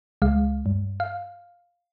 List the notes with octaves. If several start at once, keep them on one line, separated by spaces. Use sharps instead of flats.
C#2 G#3 F5
G2
F5